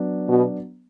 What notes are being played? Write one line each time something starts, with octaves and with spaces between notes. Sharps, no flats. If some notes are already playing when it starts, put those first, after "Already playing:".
Already playing: F#3 B3 D4
B2